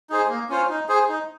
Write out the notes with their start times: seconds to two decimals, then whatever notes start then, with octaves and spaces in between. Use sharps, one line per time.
0.10 D#4 G#4 C5
0.29 A#3
0.49 C#4 F4 C5
0.69 D#4
0.89 G#4 C5
1.09 D#4